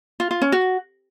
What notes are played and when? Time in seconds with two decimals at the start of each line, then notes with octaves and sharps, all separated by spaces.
0.20 F4
0.31 F4
0.42 C#4
0.52 F#4